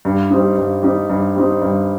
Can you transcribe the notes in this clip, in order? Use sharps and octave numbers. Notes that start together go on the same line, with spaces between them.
G2
G3 C4 D#4
G2
G3 C4 D#4
G2
G3 C4 D#4
G2